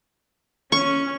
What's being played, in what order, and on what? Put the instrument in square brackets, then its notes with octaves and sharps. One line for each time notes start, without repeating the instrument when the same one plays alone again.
[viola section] C#4 [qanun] C#6